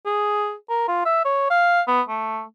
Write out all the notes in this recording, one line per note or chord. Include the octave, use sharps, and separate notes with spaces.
G#4
A#4
F4
E5
C#5
F5
B3
A3